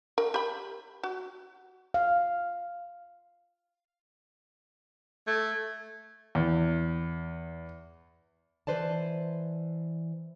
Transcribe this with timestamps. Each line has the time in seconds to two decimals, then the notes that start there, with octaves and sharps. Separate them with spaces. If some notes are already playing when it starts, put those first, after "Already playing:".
0.18 A#4
0.34 G4 B5
1.03 F#4
1.94 F5
5.27 A3 G#6
6.35 E2
8.67 E3 B4 C5 D5 A5